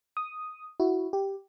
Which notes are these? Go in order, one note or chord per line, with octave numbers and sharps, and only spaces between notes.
D#6
E4 F#4
G4